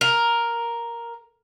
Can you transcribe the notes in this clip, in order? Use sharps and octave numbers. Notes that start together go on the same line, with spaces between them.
A#4